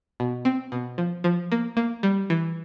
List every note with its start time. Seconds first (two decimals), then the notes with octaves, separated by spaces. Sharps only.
0.20 B2
0.45 C4
0.72 B2
0.98 F3
1.24 F3
1.52 A#3
1.77 A#3
2.03 G3
2.30 E3